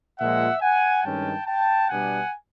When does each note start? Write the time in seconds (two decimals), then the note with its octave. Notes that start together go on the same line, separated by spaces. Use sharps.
0.18 A#2 F3 G#3 E5 F#5
0.61 F#5 G#5
1.03 G2 D#3 G#3 C#4 G5 A5
1.46 G5 A5
1.89 B2 G3 B3 D4 F#5 G#5